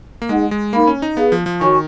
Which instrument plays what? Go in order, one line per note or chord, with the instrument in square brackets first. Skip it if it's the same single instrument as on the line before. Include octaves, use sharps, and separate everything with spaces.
[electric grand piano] A#3
[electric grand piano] G#3 [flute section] D#4 G#4 D#5 F#5
[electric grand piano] G#3
[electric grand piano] A#3 [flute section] D#4 A#4 F5 B5
[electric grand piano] C#4
D#4
[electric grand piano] B3 [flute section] G#4 B4 F5
[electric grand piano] F3
F3
[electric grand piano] D#3 [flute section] F#4 C#5 G#5 C#6